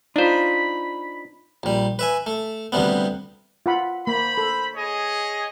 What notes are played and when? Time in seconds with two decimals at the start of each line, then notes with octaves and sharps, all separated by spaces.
0.16 D4 D#4 F4 C5 B5
1.63 A#1 G3
1.99 B4 E5 G#5
2.27 A3
2.72 D2 C3 G3 B3
3.66 F4 F#5 B5
4.07 A#3 C5 B5
4.38 A4
4.75 G#4 C#5 D#5